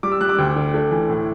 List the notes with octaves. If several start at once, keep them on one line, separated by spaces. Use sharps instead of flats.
G3 D6
E6
G3 F#6
D6
D2 G5
D3
A3
E3
A2